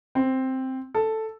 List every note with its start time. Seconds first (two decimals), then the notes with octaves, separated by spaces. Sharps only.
0.15 C4
0.94 A4